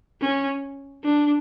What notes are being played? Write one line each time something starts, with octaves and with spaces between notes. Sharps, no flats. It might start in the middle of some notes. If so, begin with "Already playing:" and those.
C#4
D4